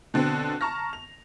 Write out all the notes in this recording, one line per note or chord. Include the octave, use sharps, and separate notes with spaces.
B2 D3 C4
A5 A#5 C#6 F6 A#6
F7